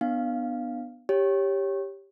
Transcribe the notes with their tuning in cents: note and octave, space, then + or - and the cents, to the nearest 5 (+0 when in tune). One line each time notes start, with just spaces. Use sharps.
B3 +0 D4 +25 F5 +0
G4 +5 C#5 +0